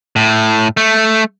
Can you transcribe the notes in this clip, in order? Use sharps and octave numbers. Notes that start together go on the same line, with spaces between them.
A2
A3